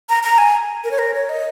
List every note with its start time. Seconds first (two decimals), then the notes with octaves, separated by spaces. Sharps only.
0.09 A#5
0.23 A#5
0.38 G#5
0.84 A#4
0.91 C#5
0.99 A#4
1.14 C#5
1.29 D#5